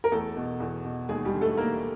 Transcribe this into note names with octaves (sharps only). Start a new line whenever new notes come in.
A#4
E2 A3 A4
B2
E2
B2
D#2 G#3 G#4
G3 G4
D3
A3 A4
D#2 A#3 A#4